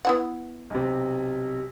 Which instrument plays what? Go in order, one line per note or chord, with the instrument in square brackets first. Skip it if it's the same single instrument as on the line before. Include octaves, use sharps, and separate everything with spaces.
[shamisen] B3 E4 F#5
[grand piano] B1 C3